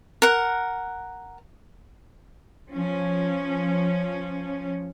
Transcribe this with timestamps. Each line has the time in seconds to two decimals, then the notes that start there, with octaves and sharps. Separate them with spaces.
0.22 A#4 F#5
2.72 F3 C#4